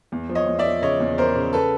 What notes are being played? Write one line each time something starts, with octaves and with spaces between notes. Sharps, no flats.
E2
F3
C#5 D#5
E2
D5 E5
F3
C#3 C#5 D#5
E2
E2 A#4 C5
C#3
A4 B4